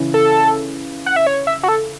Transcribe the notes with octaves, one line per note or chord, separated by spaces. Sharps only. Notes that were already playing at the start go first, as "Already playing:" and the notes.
Already playing: C#3 E3 C#4 E4
A4
F#5
E5
C#5
E5
F#4
A4